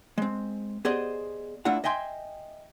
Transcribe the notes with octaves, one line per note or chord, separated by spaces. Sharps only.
G#3 C4
B3 G4 G#4 C5 D5 D#5
A3 D4 E4 F4 F#5
D#5 E5 G5 G#5 C6